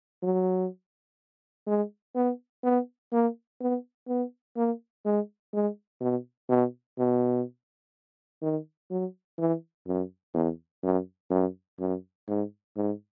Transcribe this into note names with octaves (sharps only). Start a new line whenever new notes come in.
F#3
G#3
B3
B3
A#3
B3
B3
A#3
G#3
G#3
B2
B2
B2
D#3
F#3
E3
F#2
E2
F#2
F#2
F#2
G#2
G#2